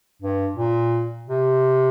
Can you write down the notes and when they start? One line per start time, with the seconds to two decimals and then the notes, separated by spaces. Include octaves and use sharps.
0.22 G2
0.57 A#2
1.27 C3